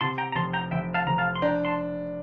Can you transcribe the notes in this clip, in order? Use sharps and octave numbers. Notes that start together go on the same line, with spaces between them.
C3 A5 C6
G5 A#5
A#5
F1 A5 C6
G5 A#5
F1 E5 G5
F5 A5
F1 A#5
F5 A5
C6
D4 G5 A#5
A5 C6